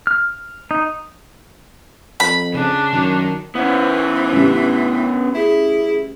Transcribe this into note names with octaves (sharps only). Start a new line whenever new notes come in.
F6
D#4
F2 B5
C#3 D4
F#2 D#3
E3 B3 C#4 C5 F#5
A1 C#3 G3 D4
E4 G#4